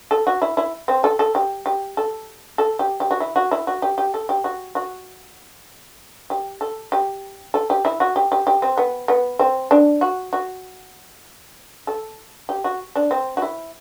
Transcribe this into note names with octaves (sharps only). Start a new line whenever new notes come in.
A4
F#4
E4
E4
C4
A4
A4
G4
G4
A4
A4
G4
G4
F#4
E4
F#4
E4
F#4
G4
G4
A4
G4
F#4
F#4
G4
A4
G4
A4
G4
E4
F#4
G4
G4
G4
C4
B3
B3
C4
D4
F#4
F#4
A4
G4
F#4
D4
C4
F#4
E4